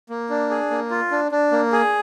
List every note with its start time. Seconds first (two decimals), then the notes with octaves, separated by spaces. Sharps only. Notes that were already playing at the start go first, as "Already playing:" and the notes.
0.09 A#3
0.30 D4
0.50 G#4
0.71 A#3
0.90 F4
1.11 D4
1.32 D4
1.52 A#3
1.72 G#4